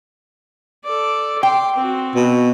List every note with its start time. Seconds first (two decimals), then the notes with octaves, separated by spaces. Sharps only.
0.84 A4 D5
1.43 G5 C6 D6
1.75 C4 F#4
2.15 B2